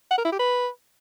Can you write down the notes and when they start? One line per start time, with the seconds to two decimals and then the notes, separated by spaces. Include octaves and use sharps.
0.11 F#5
0.18 A#4
0.25 E4
0.32 G4
0.39 B4